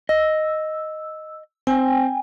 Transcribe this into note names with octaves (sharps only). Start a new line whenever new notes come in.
D#5 E6
C4 G5 G#5